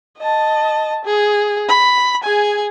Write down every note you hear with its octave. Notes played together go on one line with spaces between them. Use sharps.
D#5 A5
G#4
B5
G#4 G#5